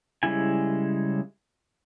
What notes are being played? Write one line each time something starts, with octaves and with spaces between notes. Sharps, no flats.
C#3 G3 G#3 E4 G#5